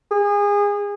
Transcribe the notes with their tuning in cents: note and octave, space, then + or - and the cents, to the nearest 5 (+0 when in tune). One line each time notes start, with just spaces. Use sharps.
G#4 -30